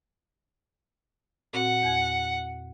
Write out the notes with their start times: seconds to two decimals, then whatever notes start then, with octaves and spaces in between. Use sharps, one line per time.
1.53 A#2 C4 F#4 F#5
1.83 E2 G#5 G#6